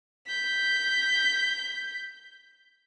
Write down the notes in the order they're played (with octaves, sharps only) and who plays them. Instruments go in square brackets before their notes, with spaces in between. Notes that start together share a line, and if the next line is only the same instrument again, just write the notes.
[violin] G6 B6